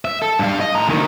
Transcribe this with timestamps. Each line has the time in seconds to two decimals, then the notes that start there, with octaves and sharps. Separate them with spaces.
0.05 E5
0.22 A4
0.39 G2 F5
0.60 D#5
0.75 A2 A#5
0.89 D2 D#3